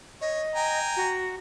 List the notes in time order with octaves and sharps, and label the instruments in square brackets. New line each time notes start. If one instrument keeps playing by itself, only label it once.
[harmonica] C#5 [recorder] D#5
[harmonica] G5 G#5 A#5
[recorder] F#4